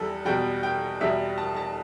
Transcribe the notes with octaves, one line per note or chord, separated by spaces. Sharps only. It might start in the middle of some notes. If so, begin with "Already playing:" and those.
Already playing: E2 E3 G3 A4
E2 B2 G3 G5
G5
E2 B2 G3 E5
A5
A5